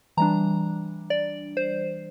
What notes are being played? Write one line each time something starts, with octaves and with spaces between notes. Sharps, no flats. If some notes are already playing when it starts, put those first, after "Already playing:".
E3 G3 D4 A#5
D5
C5